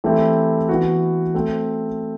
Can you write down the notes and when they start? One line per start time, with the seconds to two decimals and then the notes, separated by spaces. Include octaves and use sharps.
0.04 E3 A3 C4 E4 G4
0.69 E3 B3 F#4
1.34 A3 C4